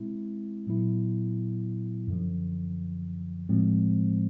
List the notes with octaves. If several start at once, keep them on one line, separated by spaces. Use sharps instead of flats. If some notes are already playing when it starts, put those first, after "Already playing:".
Already playing: B2 G#3 C4 E4
A#2 F#3 B3 E4
F#2 D3 F3
A2 F3 G#3 C4